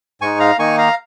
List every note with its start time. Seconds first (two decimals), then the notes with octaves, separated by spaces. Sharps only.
0.21 G#2 G#3 D#4 G#5 C#6
0.40 F5 A#5
0.59 D#3 A#3 D#4 G#5 C#6
0.78 F5 A#5